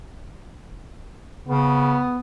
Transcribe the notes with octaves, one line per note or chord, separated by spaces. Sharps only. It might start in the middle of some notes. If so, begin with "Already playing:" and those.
C#3 B3